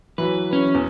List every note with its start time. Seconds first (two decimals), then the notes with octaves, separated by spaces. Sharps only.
0.18 E3 F#3 B4
0.53 C#4
0.74 E2